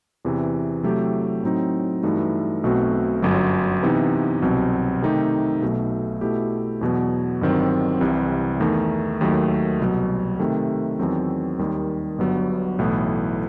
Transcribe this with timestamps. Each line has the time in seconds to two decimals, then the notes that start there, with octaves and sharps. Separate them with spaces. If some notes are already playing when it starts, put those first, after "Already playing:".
0.25 E2 C3 E3
0.83 C3 F#3 A3 E4 G4
1.43 A2 F#3 C4 D#4
2.03 G2 E3 A3 D#4 F#4
2.64 B1 B2 A3 C4 F#4
3.22 G1 F#2 F#3
3.83 C3 E3 B3 D#4
4.42 C2 B2 F#3 C4
5.02 C3 D#3 A3 D#4 G4
5.62 B1 B2 A3
6.21 B2 A3 E4 G4
6.81 E2 B2 F#3 B3
7.41 G1 G2 D#3 F#3 C4
8.00 C2 C3 E3 G3
8.60 E2 D#3 A3 D#4
9.21 D#2 D#3 F#3 A3
9.80 C2 B2 F#3
10.40 C3 D#3 A3
10.99 E2 D#3 F#3 C4
11.59 D#2 D#3 G3
12.18 G1 G2 F#3 B3
12.79 B1 A2 E3 B3